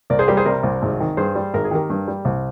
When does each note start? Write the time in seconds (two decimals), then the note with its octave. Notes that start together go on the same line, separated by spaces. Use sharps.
0.10 C2 A#4 D5
0.19 G#4 C5
0.28 G3 G4 A#4
0.37 G#4 C5
0.46 C3 A#4 D5
0.63 C2
0.82 G#1
1.00 D#3
1.17 G2 G#4 C5
1.35 G3
1.54 G#1 A#4
1.64 G#4
1.71 D#3 G4 A#4
1.90 G2
2.08 G3
2.25 C2